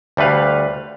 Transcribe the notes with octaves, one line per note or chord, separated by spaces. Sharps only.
D2 G3 A3 B4 F5